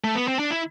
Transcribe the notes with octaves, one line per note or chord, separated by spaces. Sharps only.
A3
B3
C4
D4
E4